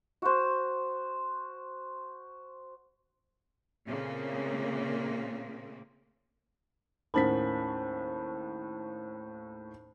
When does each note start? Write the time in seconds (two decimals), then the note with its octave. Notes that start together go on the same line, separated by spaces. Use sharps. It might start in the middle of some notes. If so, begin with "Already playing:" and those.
0.22 F#4 C5
3.87 A#2 C#3 A3 A#3 C4
7.14 D#2 A2 C#4 A#4 C5 A5 B5 B6